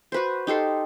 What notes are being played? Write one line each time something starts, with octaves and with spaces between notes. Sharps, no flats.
F#4 B4 C5
D#4 G4 A4 C6